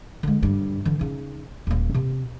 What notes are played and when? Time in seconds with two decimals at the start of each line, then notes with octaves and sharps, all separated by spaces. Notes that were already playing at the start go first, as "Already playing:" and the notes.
0.23 D3 G#3
0.43 G2 D3
0.85 D3 E3
0.99 C#3 D#4
1.67 D#1 A#3
1.95 C3